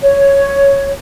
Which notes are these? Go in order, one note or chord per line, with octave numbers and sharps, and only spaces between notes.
C#5